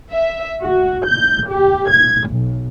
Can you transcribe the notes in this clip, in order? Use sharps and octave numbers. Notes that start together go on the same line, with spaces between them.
E5
F#4
G6
G4
G#6
B1